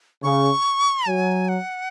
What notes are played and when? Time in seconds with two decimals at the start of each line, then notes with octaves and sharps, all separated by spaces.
0.23 C#3 C#6
1.07 F#3 G#5
1.49 F#5